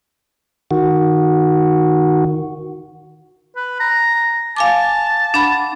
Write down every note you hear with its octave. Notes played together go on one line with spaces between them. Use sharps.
D#3 F#4
B4
A#5
F5 G#5 A5 D6
D4 F#5 B5